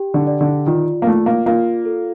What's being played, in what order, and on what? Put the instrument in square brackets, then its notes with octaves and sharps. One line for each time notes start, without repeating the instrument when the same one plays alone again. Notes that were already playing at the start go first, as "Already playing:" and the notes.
Already playing: [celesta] G4 G5
[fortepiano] D3
[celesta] D5
[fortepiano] D3
[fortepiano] D#3 [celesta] F4
[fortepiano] A#3
[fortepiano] A3 [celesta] F4
[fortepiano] A#3
[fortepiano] A#3 [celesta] F4
[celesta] A4